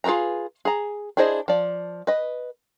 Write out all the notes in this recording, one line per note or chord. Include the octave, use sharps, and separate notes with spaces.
F4 G#4 A#4 B4 A#5
G#4 A#5
D4 E4 G#4 C5 D#5
F3 D5
B4 D#5